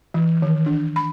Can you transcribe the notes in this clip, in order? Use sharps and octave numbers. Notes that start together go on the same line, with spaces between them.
E3
D#3
D4
B5